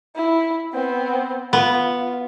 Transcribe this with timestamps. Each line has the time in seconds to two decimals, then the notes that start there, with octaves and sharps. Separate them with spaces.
0.15 E4
0.73 B3 C4
1.53 B3 F4